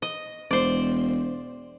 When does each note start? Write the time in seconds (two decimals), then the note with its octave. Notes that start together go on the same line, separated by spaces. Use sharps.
0.02 D#5
0.51 E1 C5 D5